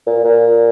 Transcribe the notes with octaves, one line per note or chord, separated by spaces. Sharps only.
A#2
A#2